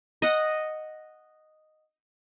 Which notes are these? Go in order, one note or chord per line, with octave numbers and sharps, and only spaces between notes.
D#5 F#5